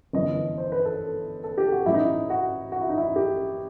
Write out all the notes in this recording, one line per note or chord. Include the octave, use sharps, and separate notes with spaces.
G1 F#2 E3 D#5
C5
B4
A4
A4
G4
F#4
A1 A2 E3 E4
D#4
E4
F#4
F#4
E4
D#4
E4
G4